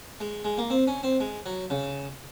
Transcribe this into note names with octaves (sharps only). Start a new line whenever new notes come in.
G#3
G#3
A#3
C4
C#4
C4
G#3
F#3
C#3